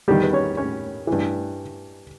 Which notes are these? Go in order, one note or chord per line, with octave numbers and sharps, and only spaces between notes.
E2 D#3 G3 G4
B4
C#4 C#5
C#4 C#5
E3
G2